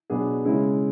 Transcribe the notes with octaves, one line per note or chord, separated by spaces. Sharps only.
B2 F#3 B3 D4 G#4
C#3 G#3 C#4 E4